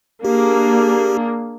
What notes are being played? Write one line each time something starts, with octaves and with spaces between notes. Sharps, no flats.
A#3 D4 G4 G#4